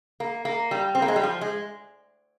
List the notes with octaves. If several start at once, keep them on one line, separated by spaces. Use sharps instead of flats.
A#3
A#3
G3
C4
A#3
G#3
G3
F3
G#3